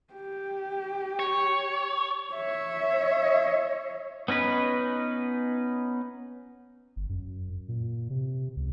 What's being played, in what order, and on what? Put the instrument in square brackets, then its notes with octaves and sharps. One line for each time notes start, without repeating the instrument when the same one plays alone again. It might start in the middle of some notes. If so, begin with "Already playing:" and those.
[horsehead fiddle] G4
[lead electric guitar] C#5
[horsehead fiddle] C#5 E5
[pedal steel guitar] B3 C#4 D#4 B4
[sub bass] G1
F#2
A#2
C3
C#2